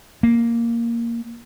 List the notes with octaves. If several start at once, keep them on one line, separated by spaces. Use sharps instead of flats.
A#3